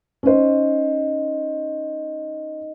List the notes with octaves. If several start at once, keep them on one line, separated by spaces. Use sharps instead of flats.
C#4 D#4 C5 D#5